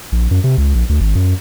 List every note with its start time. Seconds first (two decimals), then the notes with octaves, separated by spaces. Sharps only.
0.12 A#1
0.31 F#2
0.44 C3
0.58 C#2
0.75 A#1
0.89 D2
1.01 G#1
1.15 F#2